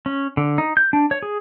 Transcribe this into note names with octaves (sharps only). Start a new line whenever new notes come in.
C#4
D3
D#4
G6
D4
C#5
G#4